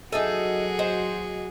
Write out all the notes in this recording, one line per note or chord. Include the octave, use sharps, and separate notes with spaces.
F#3 D#4 F#4 G#4 A4 E5 G#5
C5 D#5